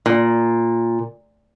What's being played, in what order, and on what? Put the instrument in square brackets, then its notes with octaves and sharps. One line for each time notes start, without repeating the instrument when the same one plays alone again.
[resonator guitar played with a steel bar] A#2